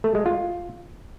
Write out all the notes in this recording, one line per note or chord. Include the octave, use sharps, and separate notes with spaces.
A3
G#3
F4